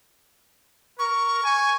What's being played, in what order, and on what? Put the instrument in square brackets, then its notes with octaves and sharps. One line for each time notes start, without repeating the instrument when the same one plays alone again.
[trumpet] A#4 [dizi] C#6
[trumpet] G#5